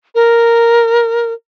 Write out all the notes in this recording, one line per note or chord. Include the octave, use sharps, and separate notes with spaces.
A#4